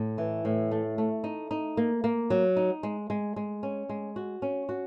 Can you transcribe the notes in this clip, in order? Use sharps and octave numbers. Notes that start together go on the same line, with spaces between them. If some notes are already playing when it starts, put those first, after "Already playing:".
Already playing: A2
E3
A2
A3
A3
D#4
D#4
A#3
A#3
F#3
D#4
G#3
G#3
G#3
C#4
G#3
F#4
C#4
F#4